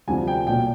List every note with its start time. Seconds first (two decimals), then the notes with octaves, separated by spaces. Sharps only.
0.08 D2 C3 F3 G#5
0.28 G5
0.47 B1 A#2 F#3 G5